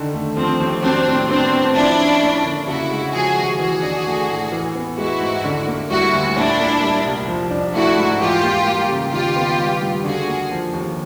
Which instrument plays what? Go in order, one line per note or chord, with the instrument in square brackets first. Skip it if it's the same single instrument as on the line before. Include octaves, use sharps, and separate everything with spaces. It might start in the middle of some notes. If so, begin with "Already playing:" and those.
Already playing: [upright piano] D3 D#3
A3
[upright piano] F3 [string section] C4
[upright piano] D#2
[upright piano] F#3 [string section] C4 D4
[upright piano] A2
[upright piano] B3 [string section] C4 D4
[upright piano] A2
[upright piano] F3 [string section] D4 E4
[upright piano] C#4
A#3
D3
[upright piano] C#3 [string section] E4 F#4
[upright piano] G#3
[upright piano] F3 [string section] F#4 G#4
[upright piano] D#2
[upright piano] E3 [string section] F#4 G#4
[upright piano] D4
A3
A2
E3
B3
[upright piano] G#3 [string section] E4 F#4
[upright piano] G#2
D3
A#3
[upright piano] G3 [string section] E4 F#4
[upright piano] D2
[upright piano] A#2 [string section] D4 E4
[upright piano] A#3
G3
C2
F3
D4
[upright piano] A3 [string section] E4 F#4
[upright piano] G#2
[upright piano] E3 [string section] F4 G4
[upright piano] A#3
G3
C#3
[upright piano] D#3 [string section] F4 G4
[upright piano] B3
G3
G2
[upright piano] D3 [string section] F#4 G#4
[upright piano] A#3
F3
D#2